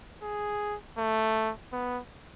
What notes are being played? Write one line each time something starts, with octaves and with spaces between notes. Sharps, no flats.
G#4
A3
B3